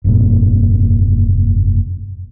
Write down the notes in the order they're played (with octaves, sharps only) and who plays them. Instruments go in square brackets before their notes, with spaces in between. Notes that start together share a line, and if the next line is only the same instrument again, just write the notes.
[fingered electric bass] F1 G2 A#2